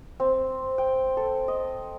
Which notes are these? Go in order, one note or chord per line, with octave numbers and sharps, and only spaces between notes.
C4
G5
A4
D#5